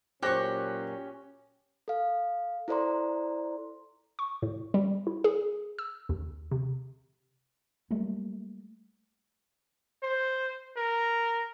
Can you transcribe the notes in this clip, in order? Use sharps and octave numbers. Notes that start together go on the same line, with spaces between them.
A#2 F#3 C#4 G4 C5 C#6 F#6 A#6
A4 F5
E4 A4 C5 D5 A#5 C6
C#6
A2
G3
E4
G#4
E6
D#2
C3
F#3 G3 A3 A#3
C5
A#4